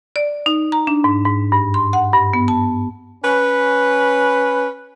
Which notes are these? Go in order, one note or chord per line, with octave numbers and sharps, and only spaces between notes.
D5
D#4
A#5
D4
G#2
G#2
G2
C6
F#5
G2
B3
A5
C#4 B4